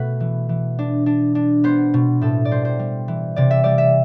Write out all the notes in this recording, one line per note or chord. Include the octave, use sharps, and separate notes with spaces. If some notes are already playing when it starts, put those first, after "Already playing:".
Already playing: B2 A3 B4
E3
E3
D4
D4
D4
B3 C5
B2
A2 A4
D5
G3 C5
C5
G3
E3
C3 D5
E5
G3 D5
E5